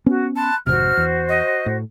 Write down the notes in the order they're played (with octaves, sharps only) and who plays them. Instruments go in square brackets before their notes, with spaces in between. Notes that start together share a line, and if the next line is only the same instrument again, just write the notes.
[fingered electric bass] B3 C#4 [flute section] F#4
[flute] A5 [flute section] B5 C6 F#6
[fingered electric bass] G#1 F2 C3 [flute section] F#4 C5 [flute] F6
[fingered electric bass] E2
[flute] D#5
[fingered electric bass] A2